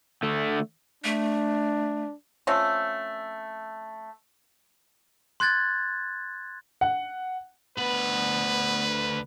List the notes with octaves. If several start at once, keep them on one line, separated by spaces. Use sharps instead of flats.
D3 A3
A3 D4
F3 A3 C4 C#4
C6 F#6 G#6 A6
F#5
D2 B3 B4 B5